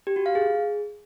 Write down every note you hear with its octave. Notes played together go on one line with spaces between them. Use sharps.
G4
F#4
F5
G#4